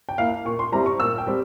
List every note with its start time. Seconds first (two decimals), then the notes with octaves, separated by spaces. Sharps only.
0.09 G5
0.18 A#3 E4 F5
0.45 A#2 C#6
0.59 C6
0.72 G3 C4 E4 A#5
0.86 C#6
1.00 A#2 E6
1.18 G5
1.27 G3 C4